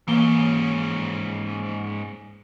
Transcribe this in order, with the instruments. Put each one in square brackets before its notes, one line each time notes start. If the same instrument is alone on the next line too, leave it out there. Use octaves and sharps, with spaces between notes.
[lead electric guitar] G#2 C#4 [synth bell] E3 A#3 G7